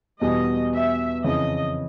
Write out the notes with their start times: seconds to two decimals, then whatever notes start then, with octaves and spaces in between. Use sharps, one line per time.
0.21 E2 B2 G3 D#5
0.73 E5
1.24 F2 C#3 E3 D#5